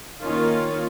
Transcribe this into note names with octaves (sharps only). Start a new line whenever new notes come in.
D#3 A#3 C#4 F4